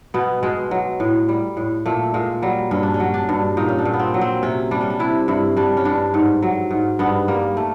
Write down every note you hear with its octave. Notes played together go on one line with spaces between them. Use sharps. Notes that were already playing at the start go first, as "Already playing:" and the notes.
B2 B3
B2 G#3
F#3
A2
G3
A2
A#2 A3
A#2 G#3
F#3 G3
G2 C#4
D4
C#4
F#3
D4
G2
A#2 D#4
C#4
D4
A#2
B3
C4
F#3
C4
C3 C#4
G3 D4
C#4
D4
C3 E4
G2 E4
G3 D4
C#4
G2 D4
G#2
F#3
G#2
G2 B3
G3 A#3
A3